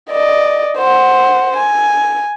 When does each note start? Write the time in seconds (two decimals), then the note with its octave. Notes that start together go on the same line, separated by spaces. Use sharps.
0.11 D5 D#5
0.78 C5 F#5
1.57 G#5